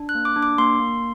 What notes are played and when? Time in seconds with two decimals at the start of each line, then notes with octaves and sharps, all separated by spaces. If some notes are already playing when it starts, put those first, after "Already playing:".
Already playing: D4
0.09 F#6
0.15 A#3
0.25 D6
0.36 D4
0.43 D6
0.58 A#3 C6
0.79 A#3